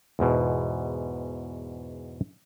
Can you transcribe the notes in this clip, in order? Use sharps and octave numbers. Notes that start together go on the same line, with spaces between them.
E2 G#2 B2